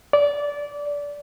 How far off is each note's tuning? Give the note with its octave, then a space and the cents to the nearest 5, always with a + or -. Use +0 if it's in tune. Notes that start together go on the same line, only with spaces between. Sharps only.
D5 -20